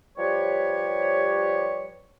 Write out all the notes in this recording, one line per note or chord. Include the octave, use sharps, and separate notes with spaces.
F3 G3 G4 B4 C#5